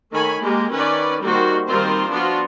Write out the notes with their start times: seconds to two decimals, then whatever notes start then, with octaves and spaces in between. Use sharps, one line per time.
0.11 D#3 A3 C#5 G#5 B5
0.42 G#3 A#3 G4
0.74 D#3 C#4 B4 D5
1.24 D#3 G3 A#3 F#4 C5
1.66 D#3 G3 C4 F4 A#4 C5
2.10 F3 B3 D4 F4 F#4